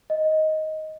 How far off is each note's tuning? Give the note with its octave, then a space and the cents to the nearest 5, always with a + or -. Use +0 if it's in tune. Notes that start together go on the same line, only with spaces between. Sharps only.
D#5 +10